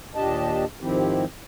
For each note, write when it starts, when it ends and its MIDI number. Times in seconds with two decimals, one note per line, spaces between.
0.15 0.65 39
0.15 0.65 46
0.15 0.65 62
0.15 0.65 67
0.15 0.65 75
0.15 0.65 81
0.81 1.25 44
0.81 1.25 51
0.81 1.25 53
0.81 1.25 60
0.81 1.25 64
0.81 1.25 67